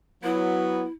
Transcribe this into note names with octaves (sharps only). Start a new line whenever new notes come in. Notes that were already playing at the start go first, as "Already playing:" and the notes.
F#3 B3 E4